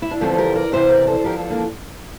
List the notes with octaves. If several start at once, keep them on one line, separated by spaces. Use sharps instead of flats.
E4
D4
E2 D3 F3 A3 C4
G4 A#4
A#4 D5
E2 C3 E3 C5 E5
A#4 D5
A4 C5
E2 D3 F3 G4 A#4
F4 A4
A#3 D4